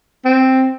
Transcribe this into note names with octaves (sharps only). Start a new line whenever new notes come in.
C4